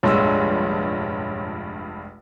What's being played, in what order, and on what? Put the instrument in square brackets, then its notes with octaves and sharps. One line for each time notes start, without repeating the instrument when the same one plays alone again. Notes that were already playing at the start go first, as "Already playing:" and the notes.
[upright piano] F1 G#3 E6 [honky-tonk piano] A#1 G2 [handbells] C#5 C6